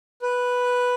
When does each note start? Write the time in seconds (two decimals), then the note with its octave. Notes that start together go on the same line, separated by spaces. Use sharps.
0.22 B4